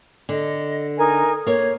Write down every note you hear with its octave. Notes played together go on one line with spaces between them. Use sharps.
D3 D#5
D#4 A#4 G#5
A#3 C#5 G#6